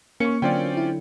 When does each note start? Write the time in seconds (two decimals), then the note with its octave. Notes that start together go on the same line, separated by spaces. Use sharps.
0.20 A#3 C#4 C#6 C#7
0.42 D3 F#3 C4 C#4 F4 D5 G5
0.77 E4